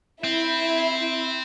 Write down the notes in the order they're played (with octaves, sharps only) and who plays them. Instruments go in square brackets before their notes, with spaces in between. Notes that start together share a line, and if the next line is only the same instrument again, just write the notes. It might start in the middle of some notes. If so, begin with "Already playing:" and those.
[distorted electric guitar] C4 [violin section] E4 E5